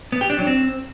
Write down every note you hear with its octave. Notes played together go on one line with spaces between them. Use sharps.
B3
G4
D4
F#3
C4